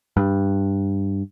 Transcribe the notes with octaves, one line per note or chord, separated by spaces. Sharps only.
G2